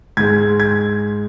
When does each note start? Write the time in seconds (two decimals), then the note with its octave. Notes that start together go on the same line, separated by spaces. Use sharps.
0.17 G#2 G#3 G#6
0.60 G#6